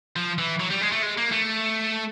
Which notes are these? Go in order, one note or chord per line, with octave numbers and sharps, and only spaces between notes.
F3
E3
F#3
G3
G#3
A3
G#3
A#3
A3